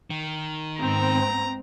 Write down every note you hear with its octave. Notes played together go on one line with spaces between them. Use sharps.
D#3
G#2 B3 C4 A#5